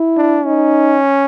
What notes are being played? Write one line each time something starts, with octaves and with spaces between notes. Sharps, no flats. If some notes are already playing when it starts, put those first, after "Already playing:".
Already playing: E4
D4
C#4 D#4